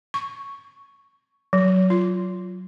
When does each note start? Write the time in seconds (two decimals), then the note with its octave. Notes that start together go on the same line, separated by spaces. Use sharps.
0.14 C#6
1.53 F#3
1.90 F4